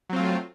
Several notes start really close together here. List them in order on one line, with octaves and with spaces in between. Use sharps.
F#3 C4 F4 A3